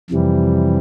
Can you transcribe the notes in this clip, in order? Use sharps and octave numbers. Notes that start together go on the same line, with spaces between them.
F2 C3 E3 G3